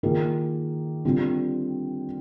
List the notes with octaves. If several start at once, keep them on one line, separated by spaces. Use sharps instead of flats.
D#3 A#3 F4 G#4
D3 G3 C4 F4